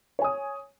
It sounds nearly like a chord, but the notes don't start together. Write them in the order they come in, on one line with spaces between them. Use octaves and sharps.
C#5 G#5 D#6